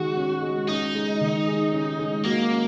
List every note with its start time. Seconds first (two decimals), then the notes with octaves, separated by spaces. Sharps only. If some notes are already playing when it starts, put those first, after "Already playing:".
Already playing: D#3 G#3 F#4 G#4
0.17 C#4
0.42 G#3
0.68 C#4 D#4
0.95 G#3
1.21 D#3
1.47 G#4
1.73 C#4
1.99 G#3
2.25 A#3 F#4
2.50 C#4